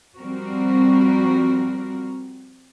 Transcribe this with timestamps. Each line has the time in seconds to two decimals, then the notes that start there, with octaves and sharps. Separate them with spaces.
0.18 F3 G3 C4 F#4 A#4